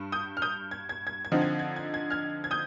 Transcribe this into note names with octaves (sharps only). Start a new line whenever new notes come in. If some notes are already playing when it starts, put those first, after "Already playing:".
Already playing: G2
D#6 G6
F6
D#6 G6
G#6
G#6
G#6
G#6
D3 F3 C4 D#4
G#6
G#6
G#6
G#6
F6 G#6
G#6
D#6 G6